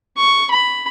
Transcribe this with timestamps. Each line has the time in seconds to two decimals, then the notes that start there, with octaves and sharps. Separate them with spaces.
0.18 C#6
0.51 B5